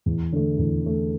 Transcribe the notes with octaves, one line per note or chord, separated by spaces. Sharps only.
E2
D3 A3
E2
D3 A3